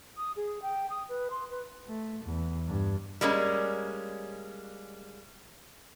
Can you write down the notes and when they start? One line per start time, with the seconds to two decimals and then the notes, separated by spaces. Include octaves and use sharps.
0.17 D#6
0.36 G#4
0.62 G5
0.90 D#6
1.09 B4
1.30 C6
1.50 B4
1.88 A3
2.25 E2
2.67 G2
3.21 G3 G#3 A#3 C#4